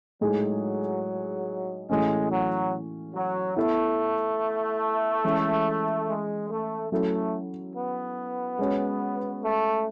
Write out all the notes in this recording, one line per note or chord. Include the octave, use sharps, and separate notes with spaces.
A2 F#3 G#3 D#4 G#4
A2 E3 G#3 A3 C#4 F#4
F#3
F#3
A3 B3 E4 A4 E5
E3 G#3 C#4
G#3
A3
F#3 A3 C#4 E4 A4
B3
G#3 C#4 F#4 C#5
A3